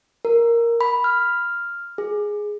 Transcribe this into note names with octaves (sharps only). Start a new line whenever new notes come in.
A#4
B5
F6
G#4